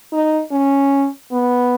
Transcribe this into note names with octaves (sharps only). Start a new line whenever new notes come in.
D#4
C#4
B3